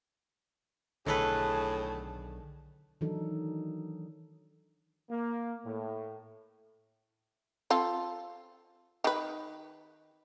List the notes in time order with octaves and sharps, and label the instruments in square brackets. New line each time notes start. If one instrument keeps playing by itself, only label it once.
[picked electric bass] B1 D3 [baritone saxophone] A2 [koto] D#3 A4 B4 [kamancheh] G#4 A5
[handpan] D#3 E3 F#3 D4 D#4 A4
[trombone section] A#3
A2
[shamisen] C4 F4 A4
D#3 B4